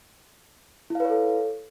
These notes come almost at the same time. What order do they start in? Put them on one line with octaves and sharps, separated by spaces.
E4 F5 B4 C#5 A4